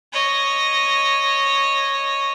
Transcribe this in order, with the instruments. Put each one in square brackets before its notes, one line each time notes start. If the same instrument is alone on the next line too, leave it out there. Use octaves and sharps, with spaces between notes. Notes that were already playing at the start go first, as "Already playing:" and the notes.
[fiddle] C#5 D#5